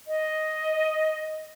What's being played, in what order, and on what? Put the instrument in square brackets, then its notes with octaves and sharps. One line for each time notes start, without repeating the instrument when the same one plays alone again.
[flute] D#5